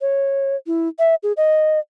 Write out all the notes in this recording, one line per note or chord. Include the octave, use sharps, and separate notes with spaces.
C#5
E4
E5
G#4
D#5